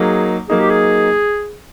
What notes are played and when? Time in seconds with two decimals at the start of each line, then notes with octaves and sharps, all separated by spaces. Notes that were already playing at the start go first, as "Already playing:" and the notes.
Already playing: F#3 A#3 D#4 G#4
0.49 F#3 A#3 D#4 G#4
0.60 G4
0.70 G#4